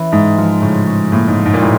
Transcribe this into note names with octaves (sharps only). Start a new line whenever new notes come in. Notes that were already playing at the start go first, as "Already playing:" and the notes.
Already playing: E3 C#4
G#2 G#3
F3
A2 C#3
C#4
A2 A#3
G#2
F3
G#2
A#2
A2 C3